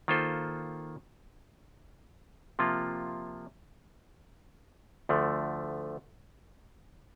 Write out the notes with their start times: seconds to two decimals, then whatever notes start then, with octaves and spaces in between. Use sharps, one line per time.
0.08 D#3 A#3 F4 A4 C5
2.59 C3 F3 A#3 F4
5.09 D2 D3 F3 A3